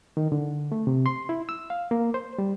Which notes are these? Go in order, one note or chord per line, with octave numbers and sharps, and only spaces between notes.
D#3
D3
A3
C3
C6
E4
E6
F5
A#3
C5
G3